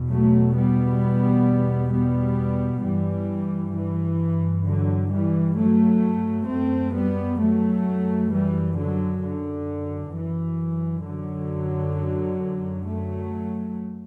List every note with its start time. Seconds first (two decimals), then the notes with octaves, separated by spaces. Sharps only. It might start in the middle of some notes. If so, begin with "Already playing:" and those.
Already playing: E2 B2
0.09 F#3 A3
0.55 G3 B3
1.92 G3 B3
2.83 G2 E3 G3
3.75 E3
4.66 D3 F#3
5.12 E3 G3
5.57 F#3 A3
6.48 F#2 A3 C4
6.94 G3 B3
7.40 F#3 A3
8.31 E3 G3
8.77 D3 F#3
9.23 D3
10.14 F#2 E3
11.06 D3 F#3
12.88 F#3 A3